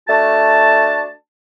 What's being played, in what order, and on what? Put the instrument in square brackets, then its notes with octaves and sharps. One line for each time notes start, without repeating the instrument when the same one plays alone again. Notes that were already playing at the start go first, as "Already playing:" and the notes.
[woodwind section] A3 D4 F#4 A5